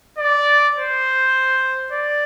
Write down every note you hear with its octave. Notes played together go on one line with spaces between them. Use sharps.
D5
C5
D5